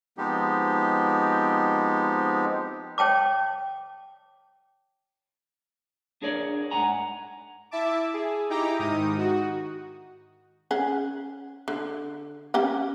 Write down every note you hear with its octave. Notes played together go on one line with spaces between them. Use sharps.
F3 G#3 B3 C4 D#4 G4
C#5 G5 A5 D6
D4 G#4 A#4 C#5 D5
G#2 F#5 G#5 A#5
E4 E5 A5 D6
G#4
D#4 E4 G4 G5 A#5 D6
G#2 D#3 D#4 D#6
F#4
C#4 G#4 F#5
D3
C#4 G4 F#5